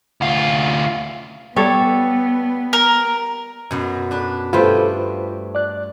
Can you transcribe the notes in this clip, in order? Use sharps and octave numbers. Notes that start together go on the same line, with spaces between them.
D2 F4
G3 B3 A4 C#5
A#4
F#2 B2 F#3
D4 B4
G2 A3 F4 B4 C5 G5
D5 F#6